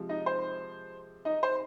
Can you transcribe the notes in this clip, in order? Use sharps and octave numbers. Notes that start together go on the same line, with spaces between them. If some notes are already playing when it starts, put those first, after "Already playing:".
Already playing: C3 F3 G#3
D#4 D#5
C5
D#4 D#5
C5